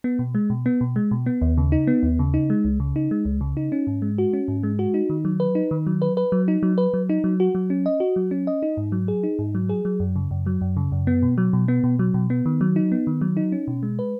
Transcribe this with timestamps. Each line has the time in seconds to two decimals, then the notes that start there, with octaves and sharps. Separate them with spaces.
0.04 B3
0.19 B2
0.35 G#3
0.50 B2
0.66 B3
0.81 B2
0.96 G#3
1.11 B2
1.26 B3
1.42 D#2
1.58 C#3
1.72 D#4
1.87 B3
2.03 D#2
2.19 C#3
2.34 D#4
2.50 G#3
2.65 C#2
2.80 C#3
2.96 D#4
3.11 G#3
3.25 C#2
3.41 C#3
3.57 D#4
3.72 C#4
3.87 G#2
4.02 G#3
4.18 F#4
4.33 C#4
4.48 G#2
4.63 G#3
4.79 F#4
4.94 D#4
5.10 D#3
5.25 F#3
5.40 B4
5.55 D#4
5.71 D#3
5.87 F#3
6.02 B4
6.17 B4
6.32 F#3
6.48 D#4
6.63 F#3
6.78 B4
6.94 F#3
7.09 D#4
7.24 F#3
7.40 F#4
7.55 F#3
7.70 C#4
7.86 D#5
8.00 F#4
8.16 F#3
8.31 C#4
8.47 D#5
8.63 D#4
8.77 G#2
8.92 F#3
9.08 G#4
9.23 D#4
9.39 G#2
9.55 F#3
9.69 G#4
9.85 F#3
10.00 F#2
10.16 C#3
10.31 F#2
10.46 F#3
10.61 F#2
10.77 C#3
10.92 F#2
11.07 B3
11.23 B2
11.38 F#3
11.53 B2
11.68 B3
11.84 B2
11.99 F#3
12.14 B2
12.30 B3
12.46 D#3
12.61 F#3
12.76 D#4
12.92 B3
13.07 D#3
13.21 F#3
13.37 D#4
13.52 C#4
13.68 B2
13.83 G#3
13.99 B4